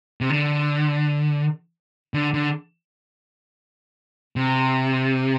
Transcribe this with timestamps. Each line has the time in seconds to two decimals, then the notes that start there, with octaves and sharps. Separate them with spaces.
0.21 C3
0.30 D3
2.14 D3
2.34 D3
4.36 C3